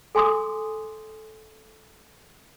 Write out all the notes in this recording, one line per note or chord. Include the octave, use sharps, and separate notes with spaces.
A4 G#5 C6 D6 D#6